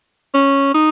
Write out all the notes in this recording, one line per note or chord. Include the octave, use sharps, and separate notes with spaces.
C#4
D#4